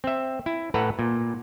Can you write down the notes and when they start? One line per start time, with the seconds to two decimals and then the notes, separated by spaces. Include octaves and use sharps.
0.04 C4 E5
0.46 E4
0.74 A2 A4 B4 F#5 A#5
0.99 A#2